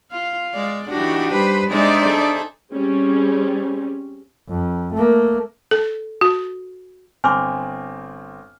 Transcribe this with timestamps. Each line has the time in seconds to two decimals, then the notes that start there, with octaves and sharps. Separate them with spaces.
0.11 F4 F5
0.54 G#3 D5
0.89 E3 D4 D#4 F#4 G4 D6
1.33 G3 B4 C5
1.70 G#3 D4 D#4 G#4 C5 D5 E5
2.06 G#4 A4
2.72 G3 C4 C#4 G#4
4.49 F2
4.94 A3 A#3
5.71 A4
6.21 F#4
7.24 G1 C4 G#5 C6 D6 F6